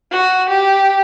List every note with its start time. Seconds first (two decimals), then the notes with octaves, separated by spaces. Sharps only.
0.11 F#4
0.48 G4